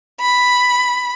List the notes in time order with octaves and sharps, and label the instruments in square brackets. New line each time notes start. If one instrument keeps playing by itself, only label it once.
[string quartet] B5